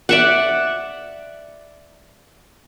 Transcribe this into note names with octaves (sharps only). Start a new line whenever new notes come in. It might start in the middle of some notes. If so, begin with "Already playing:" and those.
D5 E5 F#5